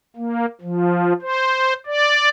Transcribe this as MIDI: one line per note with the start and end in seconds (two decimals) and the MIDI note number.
0.17 0.46 58
0.61 1.13 53
1.22 1.73 72
1.86 2.29 74